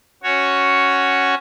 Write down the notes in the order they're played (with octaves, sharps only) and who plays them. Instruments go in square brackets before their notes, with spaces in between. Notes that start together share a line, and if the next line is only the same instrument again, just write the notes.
[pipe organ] C#4 F#4 C#5